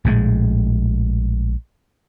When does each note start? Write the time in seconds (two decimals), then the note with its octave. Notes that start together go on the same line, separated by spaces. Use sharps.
0.05 A#1 A2 E3 G#3